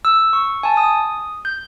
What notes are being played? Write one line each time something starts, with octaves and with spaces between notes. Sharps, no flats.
E6
C#6
G#5 A5
D#6
G6